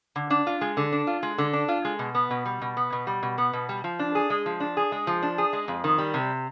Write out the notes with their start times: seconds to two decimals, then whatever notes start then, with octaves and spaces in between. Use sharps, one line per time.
0.16 D3
0.30 D4
0.47 F4
0.61 G#3
0.77 D3
0.93 D4
1.07 F4
1.23 G#3
1.38 D3
1.53 D4
1.68 F4
1.85 G#3
1.99 B2
2.15 B3
2.31 B2
2.46 G3
2.62 B2
2.77 B3
2.92 B2
3.07 G3
3.23 B2
3.38 B3
3.53 B2
3.69 G3
3.84 F3
3.99 D4
4.15 G#4
4.30 G#3
4.46 F3
4.60 D4
4.77 G#4
4.92 G#3
5.07 F3
5.23 D4
5.38 G#4
5.53 G#3
5.68 F2
5.84 D#3
5.98 G3
6.14 C3